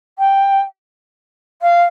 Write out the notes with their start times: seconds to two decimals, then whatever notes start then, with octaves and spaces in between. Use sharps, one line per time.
0.18 G5
1.61 F5